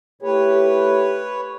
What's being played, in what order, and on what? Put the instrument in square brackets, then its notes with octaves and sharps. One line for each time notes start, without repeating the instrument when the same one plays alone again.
[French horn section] A2 A3 G4 [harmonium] B4 C#5